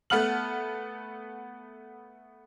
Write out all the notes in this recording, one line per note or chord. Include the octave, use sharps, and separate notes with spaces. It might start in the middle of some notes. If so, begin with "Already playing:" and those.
A3 B3 F#5 F6 F#7